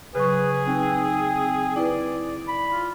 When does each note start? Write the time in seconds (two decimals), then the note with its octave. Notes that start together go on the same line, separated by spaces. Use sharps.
0.15 C#3 F#3 G#4 B4 C#6
0.68 C4 D#4
1.76 E4 B4 D5
2.48 B5
2.72 F4